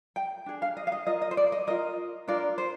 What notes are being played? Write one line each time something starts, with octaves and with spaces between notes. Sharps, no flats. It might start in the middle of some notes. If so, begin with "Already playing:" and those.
G5
D4 G#4
F5
D#5
F5
D#5
F4 A#4 D#5
D#5
C5
D5
D#5
F4 A#4 D#5
D4 F4 A#4 D5
C5